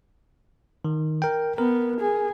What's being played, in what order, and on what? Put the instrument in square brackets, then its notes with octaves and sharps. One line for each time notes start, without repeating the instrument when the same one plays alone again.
[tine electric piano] D#3
A#4 G5
[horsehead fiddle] B3 [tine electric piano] A#4
[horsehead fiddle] G#4